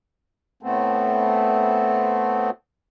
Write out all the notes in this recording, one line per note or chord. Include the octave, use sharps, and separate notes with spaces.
A2 A3 B3 C4